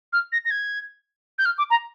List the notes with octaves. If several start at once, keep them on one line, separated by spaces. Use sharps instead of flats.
F6
A#6
A#6
G#6
G6
F6
D6
A#5